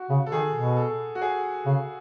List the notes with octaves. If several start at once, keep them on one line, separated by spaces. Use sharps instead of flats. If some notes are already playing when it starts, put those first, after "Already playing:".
Already playing: F#4
C#3
A4
D#3 G#4
B2
A4
F#4
G#4
C#3